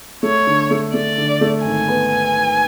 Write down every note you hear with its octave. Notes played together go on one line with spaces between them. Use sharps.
A3 C#5
D3
A3
A3 D5
D3
A3
G#1 G#5
B3